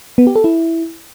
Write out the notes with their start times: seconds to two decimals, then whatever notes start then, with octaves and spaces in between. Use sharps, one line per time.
0.18 B3
0.27 G4
0.35 A4
0.44 E4